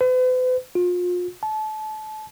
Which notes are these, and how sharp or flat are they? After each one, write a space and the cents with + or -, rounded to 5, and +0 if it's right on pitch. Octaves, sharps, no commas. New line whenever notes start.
B4 +45
F4 +35
A5 -30